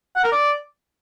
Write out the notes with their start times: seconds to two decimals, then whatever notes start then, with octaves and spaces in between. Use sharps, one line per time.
0.16 F#5
0.24 A#4
0.32 D5